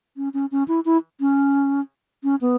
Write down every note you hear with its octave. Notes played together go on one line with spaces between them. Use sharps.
C#4
C#4
C#4
E4
E4
C#4
C#4
B3